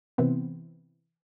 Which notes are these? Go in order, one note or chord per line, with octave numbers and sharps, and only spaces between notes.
C3 E3 B3 C4